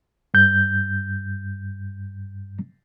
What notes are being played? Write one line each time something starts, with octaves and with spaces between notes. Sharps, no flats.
G2 G6